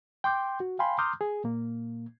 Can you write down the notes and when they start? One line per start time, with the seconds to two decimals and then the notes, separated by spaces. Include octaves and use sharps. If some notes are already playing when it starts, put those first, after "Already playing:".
0.24 G5 C6 D6 G6
0.60 F#4
0.79 F5 G5 G#5 B5 C6
0.98 A#5 C6 D6 D#6 F6 G6
1.21 G#4
1.44 A#2 A#3